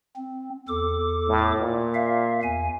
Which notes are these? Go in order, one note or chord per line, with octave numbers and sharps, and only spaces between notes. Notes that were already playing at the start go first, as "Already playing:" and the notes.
C4
E2 A4 D6
A2
A#2
E5 F5
E2 G#5